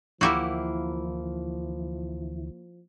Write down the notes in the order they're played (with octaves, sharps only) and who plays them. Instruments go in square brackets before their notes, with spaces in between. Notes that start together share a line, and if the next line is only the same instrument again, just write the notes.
[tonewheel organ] D2 E3 [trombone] F3 [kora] A#3 E4 [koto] F#4 G4 E5